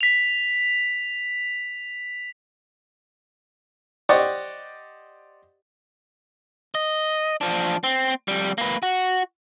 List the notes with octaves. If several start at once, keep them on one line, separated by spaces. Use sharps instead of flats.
B6 F7
G4 C5 D5 D#5 F#5 C#6
D#5
F3 D4
C4
F2 G3
A#3 B4
F#4